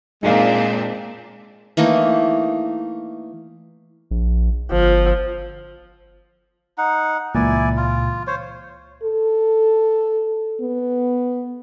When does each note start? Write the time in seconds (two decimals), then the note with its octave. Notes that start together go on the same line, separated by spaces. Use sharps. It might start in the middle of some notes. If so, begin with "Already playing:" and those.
0.23 A#2 G#3 C4 D4 D#4 A#4 F5
1.77 E3 A3 A#3 D#4
4.11 A#1
4.71 G1 F3
6.78 D#4 F#5
7.35 C#2 A#2 E3 E4 D5 G#5
7.77 F4
8.27 C5 C#5
9.03 A4
10.60 B3